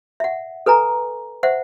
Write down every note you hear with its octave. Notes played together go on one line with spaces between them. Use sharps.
E5 F#5
A4 B4 G#5 A#5
C5 E5 F#5